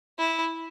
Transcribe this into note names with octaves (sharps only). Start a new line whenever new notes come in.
E4